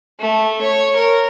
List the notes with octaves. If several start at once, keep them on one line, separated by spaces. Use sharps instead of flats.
A3
C#5
A#4